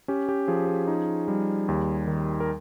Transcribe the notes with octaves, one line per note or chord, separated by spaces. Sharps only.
C#4 G4
G4
F3 G#4
G#4
D#4
G3
D#2
D#3
A#4